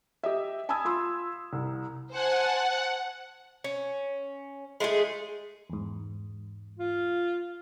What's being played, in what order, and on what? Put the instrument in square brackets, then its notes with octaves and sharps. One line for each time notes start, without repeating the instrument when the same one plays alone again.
[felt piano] G4 D#5 E5
G#5 A5 B5 D#6 E6 G#6
F4 B5 C6 E6
C2
[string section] C5 G#5 A5 [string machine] F#5
[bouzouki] C#4
G#3 A3 F4 G#4
[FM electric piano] E2 G#2
[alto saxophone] F4